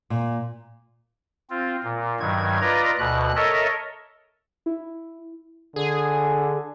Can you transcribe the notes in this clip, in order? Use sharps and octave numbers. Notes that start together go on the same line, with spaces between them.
A#2
C4 F4
A#2
G2 D#3 F#3 G#6
F4 B4 D5 D#5 A#5
D2 B2 F#6
A4 A#4 C#5 D#5 E5
E4
D3 G#4